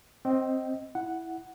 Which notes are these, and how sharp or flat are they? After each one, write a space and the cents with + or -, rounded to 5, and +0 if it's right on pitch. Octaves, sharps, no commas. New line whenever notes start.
C4 +10 D#5 +5 G5 -20
E4 +0 F#5 +0